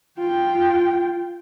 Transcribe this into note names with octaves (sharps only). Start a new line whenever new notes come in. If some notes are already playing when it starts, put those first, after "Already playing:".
F4 G5